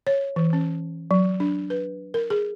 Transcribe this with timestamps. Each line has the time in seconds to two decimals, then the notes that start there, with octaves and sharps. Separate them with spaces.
0.07 C#5
0.36 E3
0.53 C#4
1.11 F#3
1.40 D4
1.70 B4
2.14 A#4
2.30 G#4